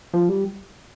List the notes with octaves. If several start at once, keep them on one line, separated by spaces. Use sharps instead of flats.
F3
G3